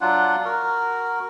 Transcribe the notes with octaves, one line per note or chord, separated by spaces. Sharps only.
F#3 D4 F4 F#5
F#4 A#4